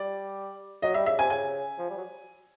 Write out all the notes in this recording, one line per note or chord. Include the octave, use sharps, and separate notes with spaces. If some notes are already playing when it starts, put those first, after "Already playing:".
Already playing: G3 D5
F#3 D#5
G3 E5
C#3 E5
C3 G#5
C#3 G#5
F3
G3
F#3